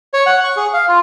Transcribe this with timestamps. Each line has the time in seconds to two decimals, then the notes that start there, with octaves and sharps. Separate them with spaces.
0.14 C#5
0.26 F#5
0.44 C#6
0.57 G#4
0.73 F5
0.88 F4